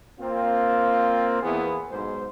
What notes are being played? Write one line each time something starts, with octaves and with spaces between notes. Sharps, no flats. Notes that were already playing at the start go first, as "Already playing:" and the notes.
A#3 C4 F4
E2 E3 A#3 B3 E4 G#4
B1 G#2 C5